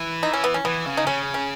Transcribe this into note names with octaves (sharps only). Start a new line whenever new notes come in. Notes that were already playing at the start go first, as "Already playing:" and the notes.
Already playing: E3
D#4
C#4
B3
C#4
E3 B3
C#3
D#4
C#3 C#4
C#4